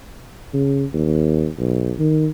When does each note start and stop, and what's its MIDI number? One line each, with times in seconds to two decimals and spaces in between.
0.54 0.84 49
0.93 1.48 39
1.58 1.94 35
1.99 2.29 51